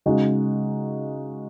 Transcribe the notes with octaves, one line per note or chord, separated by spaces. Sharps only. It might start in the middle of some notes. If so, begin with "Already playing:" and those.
C#3 G#3 D#4 F#4